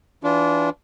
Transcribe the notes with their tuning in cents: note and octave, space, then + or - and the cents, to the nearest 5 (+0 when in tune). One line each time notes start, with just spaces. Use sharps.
E3 +0 D4 -25 F4 +0